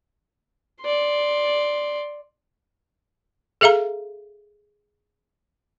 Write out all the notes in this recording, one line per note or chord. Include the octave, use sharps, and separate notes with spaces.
D5 C6
G#4 A4 E5 F5 A#5